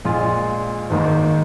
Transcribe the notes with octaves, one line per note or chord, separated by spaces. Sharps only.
A#1 A#2 G#3 F4
G#1 G#2 D#3 A#3 D#4